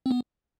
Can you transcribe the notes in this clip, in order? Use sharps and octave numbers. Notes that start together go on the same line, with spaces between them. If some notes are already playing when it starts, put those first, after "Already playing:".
C4
B3